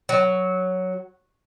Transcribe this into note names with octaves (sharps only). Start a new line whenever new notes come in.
F#3